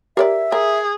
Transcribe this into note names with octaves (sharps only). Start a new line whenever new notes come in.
G4 A#4 C#5 D5 E5
G#4 A#4